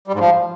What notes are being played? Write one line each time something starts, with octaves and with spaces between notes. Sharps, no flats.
G3
G#2
F3